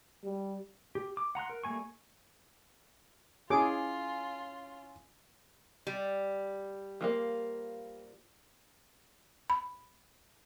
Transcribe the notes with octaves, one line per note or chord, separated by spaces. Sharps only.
G3
G4
D6
F#5 A#5 C6 F#6
A#4
G3 A3 A#3 G#5 C#6
C#4 E4 F4 G#4 D6
G3
F3 A3 A#3
B5